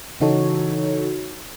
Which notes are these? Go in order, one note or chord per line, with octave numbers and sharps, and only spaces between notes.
C#3 E3 D#4 F#4 A4 C#5